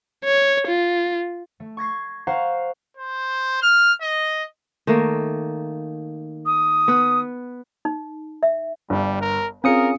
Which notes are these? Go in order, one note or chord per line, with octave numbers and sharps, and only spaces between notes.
C#5
F4
A3
C#6 G#6 A#6 C7
C5 F5 F#5 A#5 C6 C#6
C5
F6
D#5
D#3 A3 A#3
D#6
B3 B4
D#4
E5
G1 G3
A#4
C4 C#4 F4 G#4 A#4 D#6 C#7